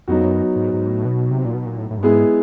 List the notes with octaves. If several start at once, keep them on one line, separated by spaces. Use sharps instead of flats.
F2 F#3 B3 D#4 F#4
F#2
G#2
G#2
A2
B2
C3
A#2
B2
A#2
A2
A2
G2
G#2 G#3 B3 E4 G#4